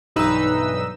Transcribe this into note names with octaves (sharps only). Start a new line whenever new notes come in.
B1 G2 E3 D#4 B4 E6